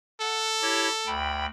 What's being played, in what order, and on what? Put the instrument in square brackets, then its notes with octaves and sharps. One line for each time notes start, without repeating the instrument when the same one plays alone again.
[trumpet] A4 [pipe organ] F#5
[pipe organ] E4 G4 C#5
D2 G5 B5